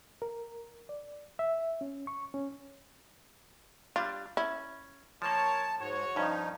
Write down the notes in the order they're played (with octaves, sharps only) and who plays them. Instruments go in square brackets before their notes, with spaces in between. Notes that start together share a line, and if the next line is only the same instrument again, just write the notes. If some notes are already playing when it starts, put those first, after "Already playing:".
[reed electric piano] A#4
D5
E5
C#4
C#6
C#4
[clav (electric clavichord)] G3 D4 [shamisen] F4
[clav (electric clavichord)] C#4 [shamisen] E4
[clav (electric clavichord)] F3 A#3 [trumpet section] A#4 C#5 [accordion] A5
[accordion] G#2 [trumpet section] F#4 C#5
[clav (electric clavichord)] G2 C#4 [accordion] F3 D#4